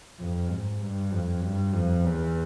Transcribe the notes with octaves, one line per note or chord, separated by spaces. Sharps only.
F2
G#2
G2
F2
G2
F2
E2